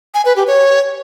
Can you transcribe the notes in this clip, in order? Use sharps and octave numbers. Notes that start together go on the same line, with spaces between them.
G#5
B4
G4
C#5